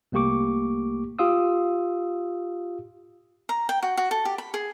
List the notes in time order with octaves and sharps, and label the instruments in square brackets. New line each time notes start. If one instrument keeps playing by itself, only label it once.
[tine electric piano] C2 A3 A#3 G4 C#6 D6
F4 G4 F5 D#6 E6
[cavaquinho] A#5
G5
F#4
F#4
A4
G4
B5
G#4